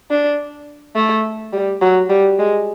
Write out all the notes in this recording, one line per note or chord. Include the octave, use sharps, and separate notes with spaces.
D4
A3
G3
F#3
G3
G#3